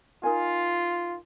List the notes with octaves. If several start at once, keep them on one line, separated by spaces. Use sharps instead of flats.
D#4 F4 A#4 G#5